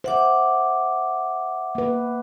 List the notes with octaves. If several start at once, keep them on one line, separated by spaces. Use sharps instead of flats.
C5 E5 F#5 D6
A#3 B4